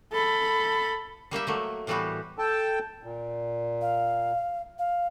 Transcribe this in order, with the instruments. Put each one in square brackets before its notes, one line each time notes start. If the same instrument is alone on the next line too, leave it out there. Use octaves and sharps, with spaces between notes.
[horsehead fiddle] A4 B5
[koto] G3 A#3 G4 E5
F#3 A3 A#3
A2 E3 G3 B3 F#4 G4
[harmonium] A4 G5 A5
A#2
[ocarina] F5
F5